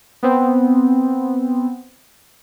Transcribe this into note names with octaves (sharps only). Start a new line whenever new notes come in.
B3 C4